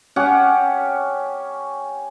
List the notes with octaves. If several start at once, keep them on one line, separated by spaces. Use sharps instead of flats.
C#4 G4 F#5